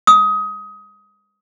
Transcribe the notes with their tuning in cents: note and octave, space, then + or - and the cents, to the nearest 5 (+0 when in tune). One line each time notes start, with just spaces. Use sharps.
D#6 +20